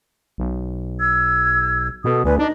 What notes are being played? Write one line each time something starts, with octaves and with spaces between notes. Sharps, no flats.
B1
E6 G#6
B2 A4 D#6
D2 B4 D5 G#5
D4 D#4 D#5